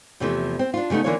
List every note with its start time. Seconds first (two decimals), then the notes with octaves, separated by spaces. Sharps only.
0.20 E2 C3 E3 F3 A3
0.59 C4
0.74 D4 F4
0.90 C#3 G3 A3 B3 D#4
1.04 D3 E3 A#3 C#4 F4 C#5